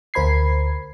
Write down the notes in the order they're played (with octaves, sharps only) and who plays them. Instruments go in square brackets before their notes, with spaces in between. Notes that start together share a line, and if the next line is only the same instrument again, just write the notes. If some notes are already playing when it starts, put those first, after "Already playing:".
[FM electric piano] D2 A#4 C5 B5 G#6 C7